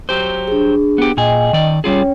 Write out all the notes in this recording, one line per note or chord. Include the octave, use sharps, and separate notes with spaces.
F#3 G4 C5
D4 G#4
B3 G4
A#2 G#4 D#5 G5
D#3 D5
G3 C#4 F4 G#4 C#5 G5